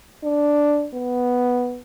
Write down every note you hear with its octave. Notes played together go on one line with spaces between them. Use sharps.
D4
B3